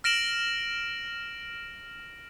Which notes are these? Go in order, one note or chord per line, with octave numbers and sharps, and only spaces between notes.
F6 A#6 D7 E7 F#7